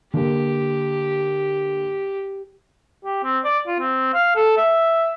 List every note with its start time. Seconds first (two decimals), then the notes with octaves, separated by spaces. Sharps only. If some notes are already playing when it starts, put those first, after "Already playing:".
0.14 D3 A#3 G4
3.04 G4
3.24 C4
3.44 D5
3.67 F4
3.79 C4
4.14 F5
4.36 A4
4.57 E5